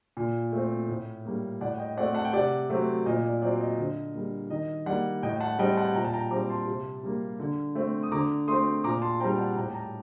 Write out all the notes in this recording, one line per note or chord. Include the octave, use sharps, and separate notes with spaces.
A#2
A3 C4
A2
G3 A#3
A2 D5 F#5
D#5 G5
A3 C4 D5 F#5
F#5 A5
G5
C3 D5 F#5
F#3 A3 C4
A#2 D#5
D5
F#3 C4 D5
D#5
D3
G3 A#3
D#3 D#5
G3 A#3 D5 F#5
A2 D#5 G5
F#5 A5
G3 C4 D#5 G5
F#5 A5
A#2 G5 A#5
A5
G5 A#5
G3 C4 A#5 D6
A5 C6
C3
G3 A#3
D3
A3 C4
D#6
D3 A#5 D6
A3 C4 C6 D#6
A#2 A#5 D6
A5 C6
G3 C4 G5 A#5
F#5 A5
A2 G5 A#5
A5
G5 A#5